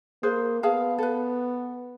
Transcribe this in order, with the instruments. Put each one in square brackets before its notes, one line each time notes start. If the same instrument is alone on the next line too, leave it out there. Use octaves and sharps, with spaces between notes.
[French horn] A#3 [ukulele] G#4 B4 C5
[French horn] B3 [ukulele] G#4 F5 A5
[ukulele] A4 B4